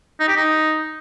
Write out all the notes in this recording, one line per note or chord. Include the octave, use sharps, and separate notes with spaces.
D#4
G4
D#4